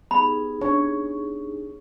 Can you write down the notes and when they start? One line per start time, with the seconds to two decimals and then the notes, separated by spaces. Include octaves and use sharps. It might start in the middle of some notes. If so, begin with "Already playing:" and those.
0.11 B3 D#4 G4 G#4 B5
0.61 C#4 D4 C#5